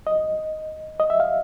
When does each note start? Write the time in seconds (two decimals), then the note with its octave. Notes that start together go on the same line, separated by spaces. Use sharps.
0.07 D#5
1.00 D#5
1.10 E5
1.20 F5